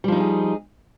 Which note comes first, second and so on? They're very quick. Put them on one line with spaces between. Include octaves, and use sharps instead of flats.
G3 F3 D#4 E4 G#4